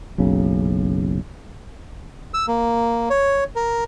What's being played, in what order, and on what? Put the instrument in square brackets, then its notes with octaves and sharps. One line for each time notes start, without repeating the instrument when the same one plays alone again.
[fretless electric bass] F#1 B1 C#3
[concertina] E6
A#3
C#5
A#4